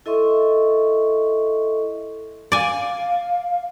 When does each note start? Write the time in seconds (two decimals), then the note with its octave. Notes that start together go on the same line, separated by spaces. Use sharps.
0.06 E4 A4 D#5 E5 C6 C#6
2.52 D5 F5 G#5